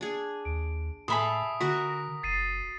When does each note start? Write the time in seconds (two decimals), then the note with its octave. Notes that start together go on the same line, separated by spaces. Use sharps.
0.01 D4 G#4
0.45 D#2 D7
1.08 A2 G#4 A4 E5 B5 C6 D#6 B6
1.61 D3 F#4 A#4 B6
2.23 F#1 A6 C7 D#7